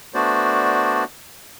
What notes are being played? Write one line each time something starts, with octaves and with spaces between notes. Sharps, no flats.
A3 B3 D4 F#4 C5 D5